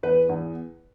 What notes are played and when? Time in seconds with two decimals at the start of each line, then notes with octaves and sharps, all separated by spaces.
0.03 E2 B4
0.29 E2